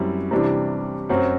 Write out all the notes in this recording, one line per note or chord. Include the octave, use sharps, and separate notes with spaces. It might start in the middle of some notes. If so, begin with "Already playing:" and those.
Already playing: F#2 G3 C4 E4
C3 E3 G3 D4
F#2 F#3 C4